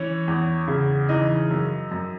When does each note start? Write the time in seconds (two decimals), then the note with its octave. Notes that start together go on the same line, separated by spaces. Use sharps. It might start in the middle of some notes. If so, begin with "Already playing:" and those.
Already playing: E3 C#4 C#5
0.28 E2
0.68 C#3
1.09 E3 D#4 D#5
1.51 F#2
1.91 F#2